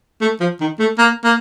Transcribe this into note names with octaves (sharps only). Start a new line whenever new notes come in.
A3
F3
D#3
A3
A#3
A#3